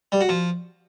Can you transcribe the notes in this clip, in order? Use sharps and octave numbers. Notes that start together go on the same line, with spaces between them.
G3
F#4
F3